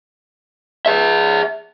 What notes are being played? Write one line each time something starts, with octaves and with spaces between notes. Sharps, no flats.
G#4 E5